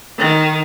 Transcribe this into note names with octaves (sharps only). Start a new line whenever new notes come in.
D#3